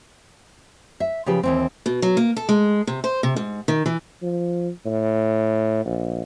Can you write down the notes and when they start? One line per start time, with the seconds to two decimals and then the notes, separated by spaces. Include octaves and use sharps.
1.00 E5
1.26 C#3 F3 G4 B4
1.43 D#2 E3 C4
1.86 B2
2.02 F#3
2.17 A#3
2.37 A4
2.49 G#3
2.87 C3
3.04 C5
3.23 C3
3.36 G#2
3.68 D#3
3.86 E3
4.22 F3
4.86 A2
5.85 A#1